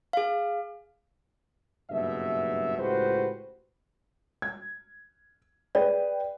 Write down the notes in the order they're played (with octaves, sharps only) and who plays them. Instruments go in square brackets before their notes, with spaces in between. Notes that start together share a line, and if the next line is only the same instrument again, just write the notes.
[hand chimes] G#4 F5
[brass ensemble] F#1 G2 B2 E5
C#2 A2 F#4 G4 B4 C5
[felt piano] G#6
[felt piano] G#4 B4 G5 [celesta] D5